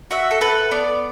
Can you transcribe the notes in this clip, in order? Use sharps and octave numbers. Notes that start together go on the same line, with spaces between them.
F#4 E5
A4
A4 B4
B3 D5